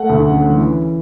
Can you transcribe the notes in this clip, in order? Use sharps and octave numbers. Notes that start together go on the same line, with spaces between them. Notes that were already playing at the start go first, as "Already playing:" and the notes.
Already playing: A3 F#5
D2
C#3
E3